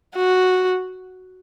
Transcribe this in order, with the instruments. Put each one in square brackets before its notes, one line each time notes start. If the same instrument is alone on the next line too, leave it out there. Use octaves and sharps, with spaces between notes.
[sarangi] F#4